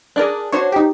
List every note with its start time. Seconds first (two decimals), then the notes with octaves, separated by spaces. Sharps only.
0.16 D4 G#4 A#4 D5 F#6
0.52 D4 F#4 C5 C#5
0.72 D#4 G4